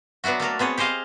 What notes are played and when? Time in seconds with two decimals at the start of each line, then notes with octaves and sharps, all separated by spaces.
0.24 F#3 B3 D4 E4 F#4
0.40 A3 A#3 A4 A#4
0.59 B3 C4 G#4 C#5
0.78 G4 G#4 C5 D#5 F5